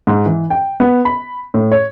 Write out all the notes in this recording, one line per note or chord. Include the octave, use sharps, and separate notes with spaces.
G#2
E3
G5
B3
B5
A2
C#5